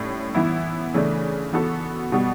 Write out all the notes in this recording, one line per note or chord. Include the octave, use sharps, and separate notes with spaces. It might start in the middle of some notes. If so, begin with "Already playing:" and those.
Already playing: A2 G3 C#4
E3 B3 E4
C#3 E3 A3 D4
E3 B3 F#4 A4
B2 G3 B3